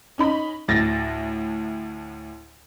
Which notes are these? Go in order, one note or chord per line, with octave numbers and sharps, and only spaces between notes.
C#4 D#4 B5
D2 A2 A6 A#6